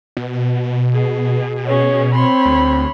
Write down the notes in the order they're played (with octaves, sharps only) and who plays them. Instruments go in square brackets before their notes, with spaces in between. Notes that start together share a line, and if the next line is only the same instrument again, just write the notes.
[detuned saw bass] B2
[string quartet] G#4
[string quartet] C#4 G#4 [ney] C#5
[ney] C4 [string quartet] C#5 B5 C6
[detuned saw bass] D2